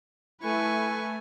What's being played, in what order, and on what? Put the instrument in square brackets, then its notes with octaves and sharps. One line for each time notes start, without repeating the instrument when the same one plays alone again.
[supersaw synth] A3 [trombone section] E4 [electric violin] B4 C#6 [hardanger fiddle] G#5